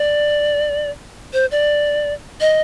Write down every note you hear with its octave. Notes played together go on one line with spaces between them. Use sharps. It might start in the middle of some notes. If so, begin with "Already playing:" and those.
Already playing: D5
C5
D5
D#5